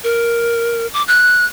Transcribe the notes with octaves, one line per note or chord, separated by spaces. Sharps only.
A#4
D6
F#6